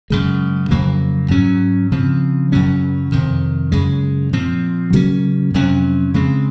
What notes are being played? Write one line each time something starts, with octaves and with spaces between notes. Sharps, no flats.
F#2 C#3 G#3
F2 C#3 F#3 A#3
G#2 F#3 C#4
C#3 F3 C4
F#2 C#3 F#3 C#4
F2 C3 D#3
F#2 C#3 G#3
A#2 F3 C4
C#3 F#3 A#3 C#4
F2 C3 F#3 C#4
C#3 G#3 C4